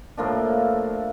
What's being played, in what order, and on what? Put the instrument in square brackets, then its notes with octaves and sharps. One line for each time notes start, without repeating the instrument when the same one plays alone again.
[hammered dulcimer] A2 F3 A#3 D4